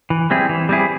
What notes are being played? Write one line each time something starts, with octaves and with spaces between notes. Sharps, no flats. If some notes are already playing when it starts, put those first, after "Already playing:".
E3
G3 C4 E4 G#4
E3
G3 C4 E4 G#4